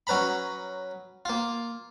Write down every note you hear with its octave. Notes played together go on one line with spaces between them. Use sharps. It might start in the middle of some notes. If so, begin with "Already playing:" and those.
F#3 C#4 B4 A#5 B5
A#3 F4